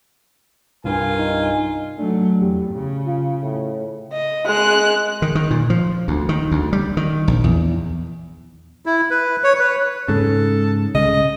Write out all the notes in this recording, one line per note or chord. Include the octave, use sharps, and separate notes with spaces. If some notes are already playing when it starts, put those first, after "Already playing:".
C2 G2 F4 A#4 G#5
D#4
F#3 A3 D4
E2 G4
C#3
F4
A2
D#5
G#3 F#6
D#3
D#3
A#2
F3
D2
D#3
D2
G3
D#3
A#1
E2
E4
B4
C#5
B4
G#2 C#3 A4
C2 C#3 G#3 D#5